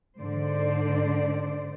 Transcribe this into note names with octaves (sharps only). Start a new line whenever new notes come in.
G#2 D3 C5 D5